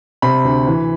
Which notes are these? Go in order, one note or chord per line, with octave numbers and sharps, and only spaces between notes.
C3 B5
D2
E3